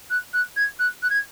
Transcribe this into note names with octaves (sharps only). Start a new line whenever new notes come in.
F#6
F#6
G#6
F#6
F#6
G#6